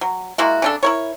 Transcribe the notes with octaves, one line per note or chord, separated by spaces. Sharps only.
F#3
G#3 A#3 E4 F#4
C#3 D4 A4
E4 A#4 C#5